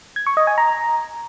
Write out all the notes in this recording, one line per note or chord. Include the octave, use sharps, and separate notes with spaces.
G#6
C#6
D#5
G#5
A#5